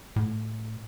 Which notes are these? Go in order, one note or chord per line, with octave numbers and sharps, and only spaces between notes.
A2